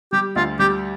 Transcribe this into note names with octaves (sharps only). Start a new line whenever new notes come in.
G3 G4
D2 F4
G3 G4